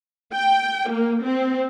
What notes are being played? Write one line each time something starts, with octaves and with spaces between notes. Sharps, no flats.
G5
A#3
C4